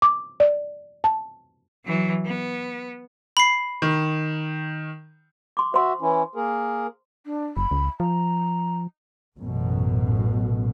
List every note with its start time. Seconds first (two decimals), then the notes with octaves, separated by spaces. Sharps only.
0.02 D6
0.40 D5
1.04 A5
1.85 E3 F#3
2.26 B3
3.37 B5 C7
3.82 D#3
5.57 C6 D6
5.74 F#4 C5 E5 C6
6.01 E3 C#4 E4
6.35 A#3 G#4 A#4
7.26 D4
7.57 F#1 B5
7.71 C#2
8.00 F3 A#5
9.38 A1 F#2 B2